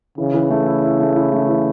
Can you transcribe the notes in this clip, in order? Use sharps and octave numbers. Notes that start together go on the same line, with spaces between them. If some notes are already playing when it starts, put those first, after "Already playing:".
C#3 E3
E3
A3
E4
E4
A3
E4
A3
E3